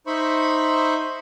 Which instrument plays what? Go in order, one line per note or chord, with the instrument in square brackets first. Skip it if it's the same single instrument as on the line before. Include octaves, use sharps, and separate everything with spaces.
[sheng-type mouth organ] D#4 C5 E5 B5 C#6